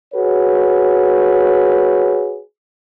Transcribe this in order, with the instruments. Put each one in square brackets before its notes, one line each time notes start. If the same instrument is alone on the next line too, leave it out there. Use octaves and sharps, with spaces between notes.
[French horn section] F#4 G#4 B4 C#5